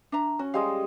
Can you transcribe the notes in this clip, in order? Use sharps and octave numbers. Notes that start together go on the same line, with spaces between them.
D4 E5 A#5
C#4 F#4
G3 G#3 D#5 F5